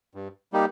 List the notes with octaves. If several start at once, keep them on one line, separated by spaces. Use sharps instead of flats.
G2
G3 A#3 D#4 G4